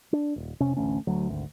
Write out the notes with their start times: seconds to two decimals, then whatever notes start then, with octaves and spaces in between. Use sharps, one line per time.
0.13 D4
0.36 D#1
0.60 F1 C3 C#4
0.77 A1 D2 A3 C#4
1.07 D2 F#3
1.29 G#1 D2